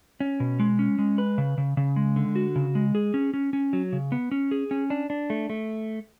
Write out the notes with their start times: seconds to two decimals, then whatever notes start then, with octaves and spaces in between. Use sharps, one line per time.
0.20 C#4
0.40 B2
0.60 G#3
0.79 C#4
0.99 G#3
1.18 B4
1.38 C#3
1.58 C#3
1.77 C#3
1.96 G#3
2.16 D3
2.36 F#4
2.56 C#3
2.75 G#3
2.95 G#4
3.14 C#4
3.34 C#4
3.53 C#4
3.73 F#3
3.93 C#3
4.12 B3
4.31 C#4
4.51 G#4
4.71 C#4
4.90 D4
5.10 D4
5.30 A3
5.50 A3